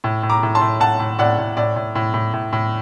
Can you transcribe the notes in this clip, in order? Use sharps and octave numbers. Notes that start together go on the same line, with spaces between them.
A2
A2
A#5 D6
A2
A5 C6
A2
A2 F#5 A5
A2
A2 D5 F#5
A2
A2 D5
A2
A2
A2
A2
A2